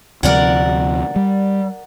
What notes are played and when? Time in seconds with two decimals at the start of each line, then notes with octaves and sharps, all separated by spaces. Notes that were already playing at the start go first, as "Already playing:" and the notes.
0.23 D2 C3 F3 A#4 D5 F#5
1.16 G3